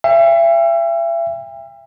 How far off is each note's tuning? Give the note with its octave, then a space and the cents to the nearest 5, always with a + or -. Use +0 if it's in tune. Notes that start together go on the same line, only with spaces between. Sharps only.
E5 +35 G5 +40